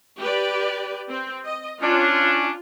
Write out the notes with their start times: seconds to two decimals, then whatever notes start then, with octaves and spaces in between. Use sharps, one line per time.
0.19 G4 B4 D5
1.09 C4
1.44 D#5
1.81 C#4 D4 F4